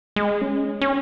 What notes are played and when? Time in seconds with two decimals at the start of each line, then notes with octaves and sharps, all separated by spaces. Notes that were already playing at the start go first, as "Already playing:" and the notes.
0.16 G#3
0.41 C#4
0.81 C#4